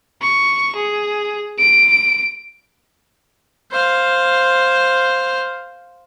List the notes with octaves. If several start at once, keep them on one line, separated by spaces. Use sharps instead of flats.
C#6
G#4
D7
C5 F5